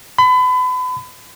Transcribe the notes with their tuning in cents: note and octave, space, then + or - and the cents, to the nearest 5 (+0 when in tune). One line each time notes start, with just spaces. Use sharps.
B5 +35